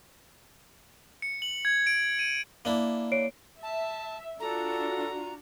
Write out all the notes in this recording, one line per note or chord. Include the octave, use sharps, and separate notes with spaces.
C#7
F#7
G#6
D7
D#7
A#3 D4 E4
C#5 C7 D7
E5 A5
D4 F4 F#4 A4 A#5